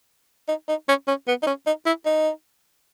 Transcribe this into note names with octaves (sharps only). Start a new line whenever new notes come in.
D#4
D#4
C#4
C#4
B3
D#4
C#4
D#4
E4
D#4